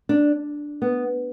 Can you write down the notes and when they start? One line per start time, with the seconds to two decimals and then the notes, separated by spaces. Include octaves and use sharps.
0.09 D4
0.82 B3